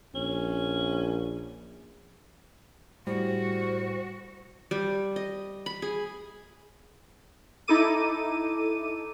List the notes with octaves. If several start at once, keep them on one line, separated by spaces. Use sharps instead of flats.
A#1 C#4
A2 G3 F#4 C5
G3
D#5
B5
G#4
D#4 E4 A4 D6 D#7